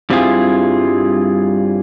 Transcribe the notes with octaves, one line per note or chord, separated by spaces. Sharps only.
G2 G3 C4 E4 F4 G#4